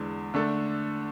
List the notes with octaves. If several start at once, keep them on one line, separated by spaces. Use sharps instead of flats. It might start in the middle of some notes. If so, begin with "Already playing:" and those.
Already playing: E2 D3 G#3
D3 A3 D4 A4